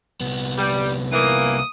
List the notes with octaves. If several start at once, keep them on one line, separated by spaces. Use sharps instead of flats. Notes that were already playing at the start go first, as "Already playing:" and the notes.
C2 B3
G3
E3 A#3 D#6